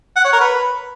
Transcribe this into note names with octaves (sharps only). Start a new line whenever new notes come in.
F#5
C#5
A#4
B4